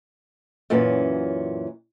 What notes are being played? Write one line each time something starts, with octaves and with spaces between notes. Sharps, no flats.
F#2 A#2 E3 F#3 C#4